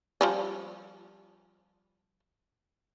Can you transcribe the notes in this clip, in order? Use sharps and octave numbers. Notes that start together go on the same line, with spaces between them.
F3 G3 C#4